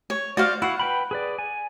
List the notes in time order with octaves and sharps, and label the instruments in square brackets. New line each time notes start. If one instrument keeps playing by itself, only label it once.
[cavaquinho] C#5
[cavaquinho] F#4 C5 F5 [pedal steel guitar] D5
[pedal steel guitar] E4 F#4 F5 [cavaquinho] F#5
[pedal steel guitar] B4 G5 B5
G#4 B4 D5
G#5